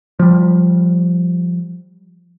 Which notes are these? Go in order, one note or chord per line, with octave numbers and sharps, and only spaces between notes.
F3 G3